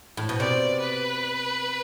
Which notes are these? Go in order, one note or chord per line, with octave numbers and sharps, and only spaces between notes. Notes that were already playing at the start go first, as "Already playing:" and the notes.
A2
B2
C3 D5
B4